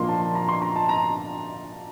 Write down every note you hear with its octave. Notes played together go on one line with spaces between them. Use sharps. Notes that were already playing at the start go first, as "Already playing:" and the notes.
Already playing: A#2 F3 A#3 D4 C6
A5
A5
A#5
C6
A#5
A5
A#5